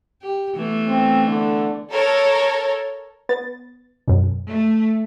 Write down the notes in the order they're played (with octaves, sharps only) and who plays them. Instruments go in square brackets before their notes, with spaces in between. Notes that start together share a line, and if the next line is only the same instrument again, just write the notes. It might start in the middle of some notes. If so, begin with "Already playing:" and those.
[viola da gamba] G4
E3 A3 B3
[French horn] C4
D3
[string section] A4 A#4 C#5
[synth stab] B3 A6
F#2 B2
[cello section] A3